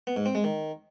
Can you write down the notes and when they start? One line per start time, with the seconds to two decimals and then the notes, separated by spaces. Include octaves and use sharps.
0.07 B3
0.16 G#2
0.26 C4
0.35 G#3
0.44 D#3